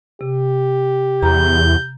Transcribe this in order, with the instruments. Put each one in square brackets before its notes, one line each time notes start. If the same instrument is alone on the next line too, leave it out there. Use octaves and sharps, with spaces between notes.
[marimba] C3 [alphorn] G4
[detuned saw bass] E2 [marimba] A#5 [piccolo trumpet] G6